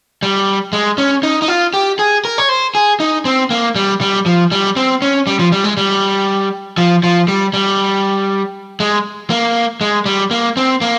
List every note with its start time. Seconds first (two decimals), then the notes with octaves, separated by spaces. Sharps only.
0.23 G3
0.73 G#3
0.98 C#4
1.23 D#4
1.42 D#4
1.48 F4
1.74 G4
1.99 G#4
2.25 A#4
2.38 C#5
2.49 C5
2.75 G#4
3.00 D#4
3.25 C4
3.50 A#3
3.75 G3
4.01 G3
4.26 F3
4.52 G3
4.76 C4
5.02 C#4
5.27 G3
5.39 F3
5.52 G3
5.64 G#3
5.77 G3
6.78 F3
7.03 F3
7.28 G3
7.54 G3
8.80 G#3
9.30 A#3
9.81 G#3
10.06 G3
10.31 A#3
10.57 C4
10.81 A#3